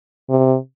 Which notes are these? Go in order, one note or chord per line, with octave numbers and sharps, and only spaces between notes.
C3